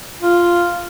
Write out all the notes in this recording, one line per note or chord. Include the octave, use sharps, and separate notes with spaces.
F4